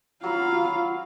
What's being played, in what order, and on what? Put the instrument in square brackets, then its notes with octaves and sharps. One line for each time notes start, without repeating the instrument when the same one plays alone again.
[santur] F#3 B5 [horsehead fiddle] F4 F5